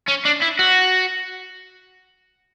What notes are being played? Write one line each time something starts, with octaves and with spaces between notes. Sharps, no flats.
C#4
D4
E4
F#4